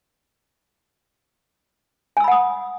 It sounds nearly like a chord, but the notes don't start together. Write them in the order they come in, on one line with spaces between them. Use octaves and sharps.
G#5 E6 B5 F#5 D#6